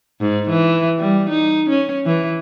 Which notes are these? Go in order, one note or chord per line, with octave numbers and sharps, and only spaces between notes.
G#2
E3
G3
D#4
C#4
E3